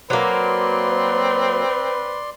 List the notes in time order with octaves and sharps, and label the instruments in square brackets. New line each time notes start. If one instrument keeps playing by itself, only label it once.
[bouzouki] F#3 A#3 [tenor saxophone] C4 [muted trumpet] B4 [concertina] D5 C6